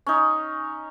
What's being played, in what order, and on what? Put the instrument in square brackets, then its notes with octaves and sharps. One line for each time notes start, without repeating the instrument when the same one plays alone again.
[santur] C#4 D#4